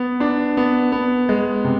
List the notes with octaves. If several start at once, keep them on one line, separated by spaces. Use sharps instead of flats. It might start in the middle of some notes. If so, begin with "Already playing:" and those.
Already playing: B3
D4
B3
B3
G#3
C3